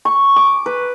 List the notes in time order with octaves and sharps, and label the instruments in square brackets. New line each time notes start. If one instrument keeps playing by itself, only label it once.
[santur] C#6
D6
B4